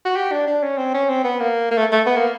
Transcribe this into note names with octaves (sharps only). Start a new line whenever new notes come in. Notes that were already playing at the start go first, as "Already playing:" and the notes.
F#4
G4
D4
D4
C#4
C4
C#4
C4
B3
A#3
A#3
A3
A3
B3
A#3